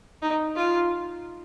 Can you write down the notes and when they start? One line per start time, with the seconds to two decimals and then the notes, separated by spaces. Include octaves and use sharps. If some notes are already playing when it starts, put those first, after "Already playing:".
0.22 D#4
0.56 F4